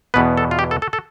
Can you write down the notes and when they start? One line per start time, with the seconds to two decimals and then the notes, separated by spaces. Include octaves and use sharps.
0.14 E2 B2 B3 B4
0.37 A4
0.51 F4
0.59 G4
0.71 A4
0.82 A4
0.93 A4